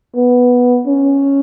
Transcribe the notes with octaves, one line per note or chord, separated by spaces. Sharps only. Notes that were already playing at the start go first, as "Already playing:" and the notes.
B3
C#4